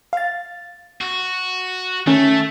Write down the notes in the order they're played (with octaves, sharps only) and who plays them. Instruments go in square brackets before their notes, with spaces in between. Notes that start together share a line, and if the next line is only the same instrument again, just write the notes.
[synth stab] F5 A6
[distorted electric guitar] F#4
[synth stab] D#3 C#4 [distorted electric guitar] A3